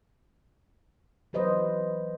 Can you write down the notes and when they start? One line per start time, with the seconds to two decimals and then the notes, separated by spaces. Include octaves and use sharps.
1.33 E3 F#3 B4 C5 D#5